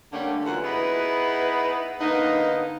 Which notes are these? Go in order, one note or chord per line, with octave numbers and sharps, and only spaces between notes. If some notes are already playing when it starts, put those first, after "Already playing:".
D3 G3 A3 A#3 C#4 D4
F#2 D3 E3 A3 F4 F#5
B3 D#4 E4 G#4 B4
D3 A#3 B3 D#4